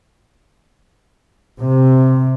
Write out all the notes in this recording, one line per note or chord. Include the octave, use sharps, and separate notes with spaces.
C3